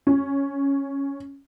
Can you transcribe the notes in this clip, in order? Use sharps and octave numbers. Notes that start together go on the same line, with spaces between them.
C#4